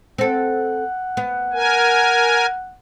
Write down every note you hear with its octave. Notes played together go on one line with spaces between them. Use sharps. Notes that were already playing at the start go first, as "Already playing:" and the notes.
C4 A4 F#5
B3
A#4 G#5